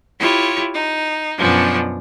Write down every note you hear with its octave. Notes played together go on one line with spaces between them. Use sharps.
E4 F4 G4 C#5
D#4
F#2 B2 F3 C#4 D4